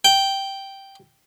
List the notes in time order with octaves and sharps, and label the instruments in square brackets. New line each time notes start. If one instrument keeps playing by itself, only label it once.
[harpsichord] G5